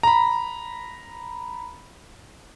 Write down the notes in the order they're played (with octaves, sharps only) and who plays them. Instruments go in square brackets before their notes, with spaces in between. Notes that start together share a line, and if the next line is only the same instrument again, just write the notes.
[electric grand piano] A#5 B5